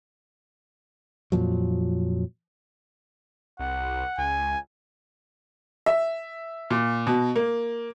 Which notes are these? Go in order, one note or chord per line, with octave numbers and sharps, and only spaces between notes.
F2 A#2 F3 F#3
C2 F#5
C#2 G#5
E5
A#2
B2
A#3